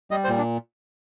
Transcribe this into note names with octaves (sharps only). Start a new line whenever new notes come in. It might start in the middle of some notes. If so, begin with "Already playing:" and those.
G3 D#5
C5
A#2
D4